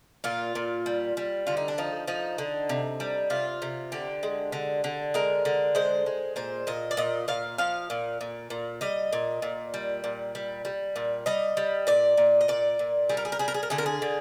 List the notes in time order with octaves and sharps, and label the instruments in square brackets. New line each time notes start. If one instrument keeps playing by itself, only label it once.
[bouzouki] A#2 F4
A#2
G3
G3
D3 F4
D#4
D4
F3 D#4
F3 D#4
D3
C3
G3
C3 F4
C3
D3 G4
G#3
D3
D3
G#3 A#4
D3
G#3 C5
G#3
A#2 C5
A#2 D#5
D5
A#2 D#5
A#2 F5
F3 F5
A#2
A#2
A#2
G3 D#5
A#2
A#2
G3
A#2
G3
G3
A#2
G3 D#5
G3
A#2 D5
A#2
D#5
A#2 D5
A#2
G3 G#4
A#4
G#4
A#4
G3 G#4
A#4
G#4
A#4
D3 G#4
A#4
G#4
D3